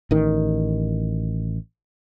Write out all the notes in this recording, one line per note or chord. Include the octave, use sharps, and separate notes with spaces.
A1 D#3